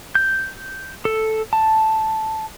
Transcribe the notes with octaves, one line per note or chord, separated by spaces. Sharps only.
G6
A4
A5